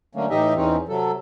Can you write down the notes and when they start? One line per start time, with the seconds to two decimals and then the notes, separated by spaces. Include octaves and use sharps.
0.15 D3 F#3 A3 A#3 C#4
0.30 A2 E3 D#4 G4 D#5 E5
0.56 E2 E3 C4 C#4 D#4
0.88 C3 F#3 A4